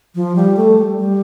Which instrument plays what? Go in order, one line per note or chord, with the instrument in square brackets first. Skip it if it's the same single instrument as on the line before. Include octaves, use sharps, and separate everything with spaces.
[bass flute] F3
G3
A3
G3
G3